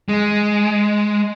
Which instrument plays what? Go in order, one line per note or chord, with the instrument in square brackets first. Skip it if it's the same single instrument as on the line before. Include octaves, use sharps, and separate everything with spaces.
[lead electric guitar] G#3